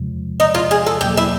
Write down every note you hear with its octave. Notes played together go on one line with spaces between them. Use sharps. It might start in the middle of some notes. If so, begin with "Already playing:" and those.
Already playing: E2 C3 F3 G#3
D#4
F4
G#4
A4
E2 B2 F#3 A#3 G4
E4